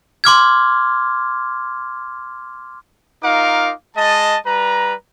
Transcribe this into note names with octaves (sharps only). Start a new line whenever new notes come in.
C6 D6 F6 G#6
D#4 F4 A#4 F5 D6
G#3 D#5 A5
G3 B4 A#5